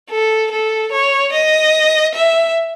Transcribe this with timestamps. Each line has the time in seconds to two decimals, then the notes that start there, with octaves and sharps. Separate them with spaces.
0.10 A4
0.51 A4
0.92 C#5
1.33 D#5
2.15 E5